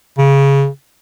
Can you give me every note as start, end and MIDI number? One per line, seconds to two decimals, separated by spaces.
0.18 0.68 49